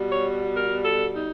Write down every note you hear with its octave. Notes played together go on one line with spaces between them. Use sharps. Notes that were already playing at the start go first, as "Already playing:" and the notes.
Already playing: B2 G3
C#5
A#4
A4
D#4